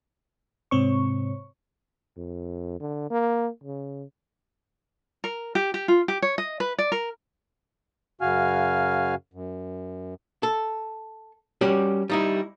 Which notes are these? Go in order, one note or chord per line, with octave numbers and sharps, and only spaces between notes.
G#2 C3 C4 C#5 C#6
F2
D3
A#3
C#3
A#4
G4
G4
F4
G4
C#5
D#5
B4
D5
A#4
F#2 C#3 F#4 F5 G#5 F6
F#2
A4
G3 C#4 F#4 G4
G3 D#4 E4